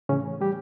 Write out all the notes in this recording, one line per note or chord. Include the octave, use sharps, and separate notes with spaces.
A2 C#3 E3 C#4
G3 G4